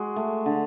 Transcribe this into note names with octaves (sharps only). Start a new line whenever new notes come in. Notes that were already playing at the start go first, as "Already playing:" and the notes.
Already playing: G#3 F#4
A3
D3